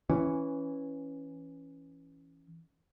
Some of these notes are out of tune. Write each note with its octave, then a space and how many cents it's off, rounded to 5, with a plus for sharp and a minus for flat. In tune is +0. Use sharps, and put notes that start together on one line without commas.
E3 +0 C#4 -5